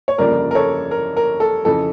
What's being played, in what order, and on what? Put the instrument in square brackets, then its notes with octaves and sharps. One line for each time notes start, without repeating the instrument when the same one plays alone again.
[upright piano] C#5
G1 F2 C#3 G3 A#3 A#4 D5
A#4
A4 C#5
A#4
A#4
A4
F2 C#3 E3 A4